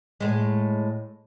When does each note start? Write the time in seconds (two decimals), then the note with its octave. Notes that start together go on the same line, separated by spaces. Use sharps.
0.20 A2 G#3